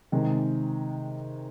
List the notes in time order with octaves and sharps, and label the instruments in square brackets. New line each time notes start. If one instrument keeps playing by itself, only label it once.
[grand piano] C3 D#3 G#3